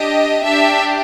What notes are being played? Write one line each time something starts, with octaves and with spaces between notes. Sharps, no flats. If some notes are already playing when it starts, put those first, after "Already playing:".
Already playing: D4 G4 D#5
D4 G4 E5